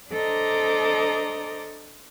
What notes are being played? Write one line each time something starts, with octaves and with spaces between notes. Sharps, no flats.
D4 A4 C5 D#5 A#5 D6